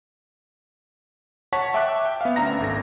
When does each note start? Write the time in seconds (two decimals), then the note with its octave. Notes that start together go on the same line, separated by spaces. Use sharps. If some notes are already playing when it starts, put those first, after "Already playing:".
1.53 C#5 F#5 A5 C#6 B6
1.74 E5 G5 A5 C#6 D6 F#6
2.05 G5
2.21 B3 E5 F5
2.36 D2 C#4 D4 E5 A#5 A#6
2.60 G#1 A4 A#6